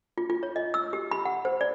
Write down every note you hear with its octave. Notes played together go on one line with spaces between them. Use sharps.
F4
F4
C#5
D#5
E6
G4
B5
F#5
C5
D5